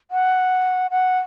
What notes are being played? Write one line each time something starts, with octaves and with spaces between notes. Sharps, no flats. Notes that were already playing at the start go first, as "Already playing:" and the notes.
F#5
F#5